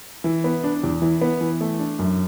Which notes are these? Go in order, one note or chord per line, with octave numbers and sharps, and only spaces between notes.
E3
B3
D4
E2
E3
B3
E3
A3
D4
F#2